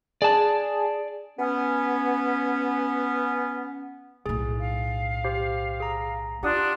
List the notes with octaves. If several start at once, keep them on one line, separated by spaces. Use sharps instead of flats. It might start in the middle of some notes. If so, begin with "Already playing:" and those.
G#4 D5 A5
B3 C#4
B1 A2 G#4
F5
G4 C5
G#4 A#5
D4 E4 F4 G4 F#5 D#6